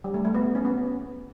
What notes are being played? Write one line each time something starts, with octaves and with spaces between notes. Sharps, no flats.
G3
A3
A3
B3
C#4
B3